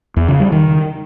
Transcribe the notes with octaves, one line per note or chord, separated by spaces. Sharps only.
E2
C#3
G3
D#3